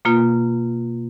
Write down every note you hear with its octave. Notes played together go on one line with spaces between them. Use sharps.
B2 A#3 F4